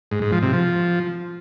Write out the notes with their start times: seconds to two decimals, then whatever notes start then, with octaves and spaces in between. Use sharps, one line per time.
0.11 G#2
0.22 G#2
0.32 F3
0.43 C3
0.53 F3